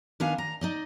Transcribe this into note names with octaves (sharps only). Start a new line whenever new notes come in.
D#3 B3 D4 F5 G#5
A#5
D#4 D5 D#5